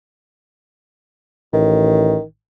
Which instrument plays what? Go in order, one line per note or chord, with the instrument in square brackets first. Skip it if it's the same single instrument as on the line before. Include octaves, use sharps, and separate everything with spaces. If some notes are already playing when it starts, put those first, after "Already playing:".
[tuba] A1 [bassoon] D#3